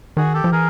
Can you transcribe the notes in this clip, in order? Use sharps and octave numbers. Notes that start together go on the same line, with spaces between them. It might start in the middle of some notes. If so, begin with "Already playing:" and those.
D#3 F#4 G#4
G4 A4
F3
E3 G#4 A#4